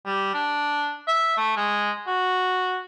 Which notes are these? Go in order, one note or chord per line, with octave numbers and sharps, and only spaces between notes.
G3
D4
E5
A3
G#3
F#4